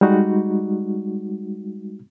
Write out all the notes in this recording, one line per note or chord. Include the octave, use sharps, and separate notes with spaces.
G3 G#3 D#4 F#4